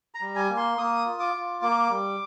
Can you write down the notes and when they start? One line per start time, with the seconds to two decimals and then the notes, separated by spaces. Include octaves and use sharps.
0.15 A#5
0.21 G3
0.36 G#5
0.50 A#3
0.57 C6
0.78 A#3 D#6
1.06 F4
1.20 D6
1.34 F4
1.62 A#3 D6
1.90 G3